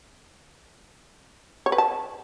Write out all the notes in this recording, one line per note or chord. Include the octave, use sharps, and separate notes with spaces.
C#5
B4
A5